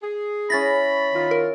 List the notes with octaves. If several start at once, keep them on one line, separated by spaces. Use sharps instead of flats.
G#4
C#4 E4 B5 A6 A#6
D#3 F4
A#4